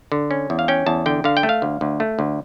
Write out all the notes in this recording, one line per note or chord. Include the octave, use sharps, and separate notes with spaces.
D3
C#4
E2
F5
C#4 G5
E2 A5
D3 G5
D3 F5
G5
A3
F5
D2
D2
A3
D2